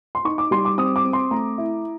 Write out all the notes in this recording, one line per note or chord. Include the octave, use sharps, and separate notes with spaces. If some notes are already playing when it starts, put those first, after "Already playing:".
C6
D#4 C#6
D6
G3 C6
D6
C4 D#6
D6
C4
C6
A3 A#5
E4